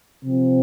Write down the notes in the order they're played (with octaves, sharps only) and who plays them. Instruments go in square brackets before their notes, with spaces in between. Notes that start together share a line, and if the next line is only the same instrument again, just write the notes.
[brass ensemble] C3 F3 C4